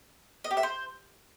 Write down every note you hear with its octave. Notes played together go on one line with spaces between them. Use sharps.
D#5
G4
E5
C5